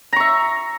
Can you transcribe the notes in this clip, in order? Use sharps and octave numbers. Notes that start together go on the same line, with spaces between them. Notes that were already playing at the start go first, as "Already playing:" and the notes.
E5 A#5 C#6